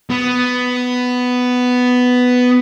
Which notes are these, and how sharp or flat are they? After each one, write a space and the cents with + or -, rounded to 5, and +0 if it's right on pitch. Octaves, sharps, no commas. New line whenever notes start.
B3 +10